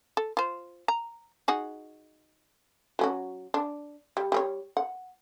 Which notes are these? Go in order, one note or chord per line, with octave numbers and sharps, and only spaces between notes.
A4
F4 C5
A#5
D#4 F#4 G#4
F#3 C#4 F#4
D4
G3
G3 G#4 C#5
F#5